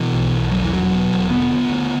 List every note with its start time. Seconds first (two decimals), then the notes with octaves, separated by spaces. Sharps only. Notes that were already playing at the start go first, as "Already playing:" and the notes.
Already playing: B2 E3
0.13 B1
0.32 B1
0.51 E2 F#3
0.63 E3
0.71 E1 F#3
0.92 B2
1.11 E1
1.30 D3 B3
1.51 D3
1.70 D2